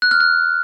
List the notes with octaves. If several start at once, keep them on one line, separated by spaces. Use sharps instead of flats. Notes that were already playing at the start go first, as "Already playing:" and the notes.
F#6
F6
F#6